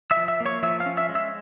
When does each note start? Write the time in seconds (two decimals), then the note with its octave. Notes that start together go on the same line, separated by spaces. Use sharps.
0.11 E5 E6
0.17 F3
0.28 E5 E6
0.40 A#3
0.46 C#5 C#6
0.62 F3 E5 E6
0.80 F5 F6
0.86 C#4
0.97 E5 E6
1.09 G#3
1.15 E5 E6